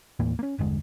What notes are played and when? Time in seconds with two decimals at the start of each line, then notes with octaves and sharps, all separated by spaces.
0.19 D#2 A2 E3 A#3
0.39 A#3 C#4
0.58 G1 E2 D3 G#3